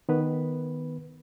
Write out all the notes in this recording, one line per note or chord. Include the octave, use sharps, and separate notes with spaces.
D#3 B3 B4